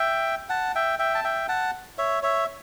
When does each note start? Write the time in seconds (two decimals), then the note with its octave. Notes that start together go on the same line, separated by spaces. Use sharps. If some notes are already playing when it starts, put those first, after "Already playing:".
Already playing: E5 G5
0.49 F#5 A5
0.75 E5 G5
0.99 E5 G5
1.15 A5
1.24 E5 G5
1.49 F#5 A5
1.98 C#5 E5
2.23 C#5 E5